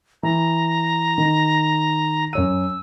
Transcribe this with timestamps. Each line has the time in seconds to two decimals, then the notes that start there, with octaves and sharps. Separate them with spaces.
0.23 E3 A#5
1.18 D#3
2.33 F#2 C#5 E6 D#7